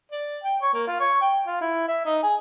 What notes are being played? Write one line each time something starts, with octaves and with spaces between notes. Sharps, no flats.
D5
G5
C#5
A#3
F4
C#5
G5
F4
E4
E5
D#4
G#4